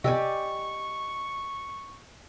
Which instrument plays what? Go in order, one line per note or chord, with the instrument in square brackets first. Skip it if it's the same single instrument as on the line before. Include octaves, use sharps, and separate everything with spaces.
[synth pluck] C3 [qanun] G4 D5 G#5 [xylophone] D#5 E6 [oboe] C#6